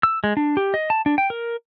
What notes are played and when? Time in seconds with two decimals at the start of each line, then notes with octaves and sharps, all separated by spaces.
0.03 E6
0.24 G#3
0.37 D4
0.57 G4
0.74 D#5
0.90 A5
1.06 D4
1.18 G5
1.30 A#4